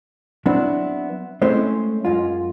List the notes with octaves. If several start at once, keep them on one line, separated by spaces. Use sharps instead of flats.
F#3 B3 C4 D4 E4
G#3 A3 C4 C#4 E4 C5
F#2 G#3 F4